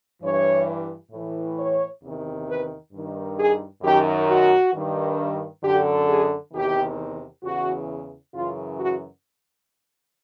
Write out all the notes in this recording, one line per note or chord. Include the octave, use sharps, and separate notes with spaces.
G2 E3 C#5
A2 E3
C#5
E2 C3 D#3
B4
G2 D#3
G#4
F#2 D#3 G4
F#4
G2 D#3
F#2 D3 G4
G#4
E2 C3 D#3 G4
E2 C#3 E3 F#4
F#2 C#3 E3 F4
F#4